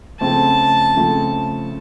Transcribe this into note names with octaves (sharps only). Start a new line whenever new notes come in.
C#3 F3 A3 C4 A5
C#3 F3 A3 C4